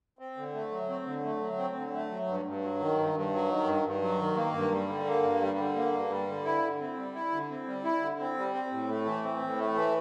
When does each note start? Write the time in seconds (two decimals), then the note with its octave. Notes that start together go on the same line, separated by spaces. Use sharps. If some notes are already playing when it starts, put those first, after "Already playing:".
0.19 C4
0.37 D3
0.54 A3
0.71 F#3
0.89 C4
1.06 D3
1.24 A3
1.41 F#3
1.58 C4
1.76 D3
1.94 A3
2.11 F#3
2.27 G2
2.46 G2
2.62 F#3
2.80 D#3
2.98 G2
3.14 G2
3.33 F#3
3.49 D#3
3.67 G2
3.84 G2
4.02 F#3
4.19 D#3
4.36 A#3
4.54 G2
4.72 G3
4.88 D3
5.07 A#3
5.23 G2
5.41 G3
5.58 D3
5.76 A#3
5.93 G2
6.10 G3
6.27 D3
6.45 E4
6.62 D3
6.80 C4
6.97 G3
7.15 E4
7.32 D3
7.50 C4
7.67 G3
7.84 E4
8.01 D3
8.19 C4
8.37 G3
8.54 C4
8.71 A2
8.89 A3
9.06 E3
9.23 C4
9.41 A2
9.58 A3
9.75 E3